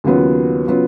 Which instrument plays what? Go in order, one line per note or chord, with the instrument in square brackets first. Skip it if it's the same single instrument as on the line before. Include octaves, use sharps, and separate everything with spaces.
[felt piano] D#2 C#3 F#3 B3 F4
C#3 F#3 B3 F4